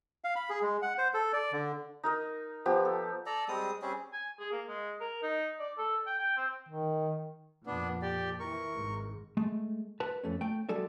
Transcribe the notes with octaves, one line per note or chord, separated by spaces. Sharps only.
F5
B5
G#4
G#3
F#5
C5
A4
D5
D3
D#4 A#4 D#5
F3 B3 G4
A4
A4 D5 A#5
G3 G#3 C4 D#6
G3 C4 C#4 G#4
G#5
G#4
A#3
G#3
A#4
D#4
D5
A4
G5
G5
C4
D#3
F2 A#2 F3 B3 D4
G4 D5
E3 A#4 C#6
G#1 G#2
G#3 A3
B4 A5
F2 A3 C#4
A3 G5
F#3 G#3 A4 D5 E5